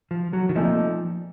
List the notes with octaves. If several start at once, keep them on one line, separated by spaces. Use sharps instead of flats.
F3
F#3
D#3
C2 A#2 F3 A3 D#4